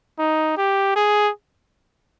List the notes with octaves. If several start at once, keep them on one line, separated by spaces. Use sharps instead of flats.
D#4
G4
G#4